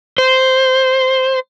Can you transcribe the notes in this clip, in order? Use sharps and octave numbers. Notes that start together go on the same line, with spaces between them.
C5